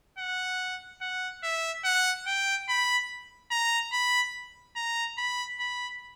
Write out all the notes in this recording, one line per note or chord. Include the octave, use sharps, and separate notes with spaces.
F#5
F#5
E5
F#5
G5
B5
A#5
B5
A#5
B5
B5